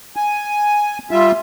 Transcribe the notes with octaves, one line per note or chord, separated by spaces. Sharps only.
G#5
G3 F4 E5